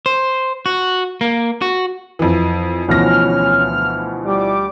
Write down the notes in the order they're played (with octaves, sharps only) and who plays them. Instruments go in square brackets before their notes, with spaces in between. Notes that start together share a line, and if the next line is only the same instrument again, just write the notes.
[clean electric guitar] C5
F#4
A#3
F#4
[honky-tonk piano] F2 E3
[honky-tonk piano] D2 A#6 [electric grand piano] B2 E3 F3 [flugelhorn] C#4 [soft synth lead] F6
[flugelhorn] G3 [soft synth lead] D6